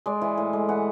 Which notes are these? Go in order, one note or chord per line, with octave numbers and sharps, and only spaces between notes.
G#3 D5
E3
A2
G#3
E3 F#5